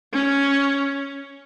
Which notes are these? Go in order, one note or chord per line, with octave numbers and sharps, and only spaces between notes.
C#4